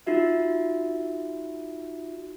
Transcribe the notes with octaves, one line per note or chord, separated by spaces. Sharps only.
D#4 F4 F#4 E5